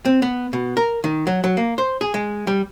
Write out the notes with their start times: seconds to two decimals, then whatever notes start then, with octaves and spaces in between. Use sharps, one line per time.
0.05 C4
0.22 B3
0.53 B2
0.77 A#4
1.04 D#3
1.27 F#3
1.44 F#3
1.57 A#3
1.78 C5
2.01 G#4
2.14 G#3
2.47 G3